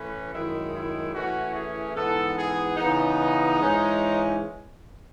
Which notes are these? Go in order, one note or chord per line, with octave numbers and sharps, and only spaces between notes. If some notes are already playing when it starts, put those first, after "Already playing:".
Already playing: A2 E3 A3 C#4 B4
F#2 D#3 G#3 E4
E4
A2 E3 A3 C#4 F#4
G#4
G#2 E3 B3 A4
G#4
C#3 E3 B3 D#4
G#2 E3 G#3 C#4